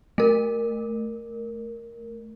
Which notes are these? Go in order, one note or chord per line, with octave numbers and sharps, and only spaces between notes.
A3 A#4